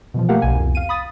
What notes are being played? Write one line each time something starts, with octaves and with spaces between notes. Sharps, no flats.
B2 E3 F3
A3 A#3 G4 A#4 F5 F#5
B1 B2 G#5
C2 F2
F5 D#7
B5 D#6 A6